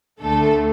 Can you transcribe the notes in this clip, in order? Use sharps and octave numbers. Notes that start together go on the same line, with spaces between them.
D2 D3 A3 A4